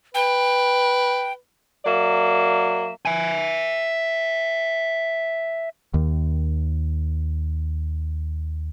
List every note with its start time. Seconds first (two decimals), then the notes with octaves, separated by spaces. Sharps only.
0.15 B4 G5
1.85 F#3 A#3 D5 E5
3.06 E5 G#5
5.94 D#2 D#3